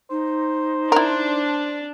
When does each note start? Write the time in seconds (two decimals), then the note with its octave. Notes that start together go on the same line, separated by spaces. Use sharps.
0.11 D#4 C5
0.92 D4 E4 A#4